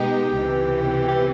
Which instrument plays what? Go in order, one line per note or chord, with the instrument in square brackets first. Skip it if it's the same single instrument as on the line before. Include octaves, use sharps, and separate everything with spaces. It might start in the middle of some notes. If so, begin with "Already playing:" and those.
Already playing: [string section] B2 G#3 B3 D#4 [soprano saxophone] G4
[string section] C#2 C3 E3
[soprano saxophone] G4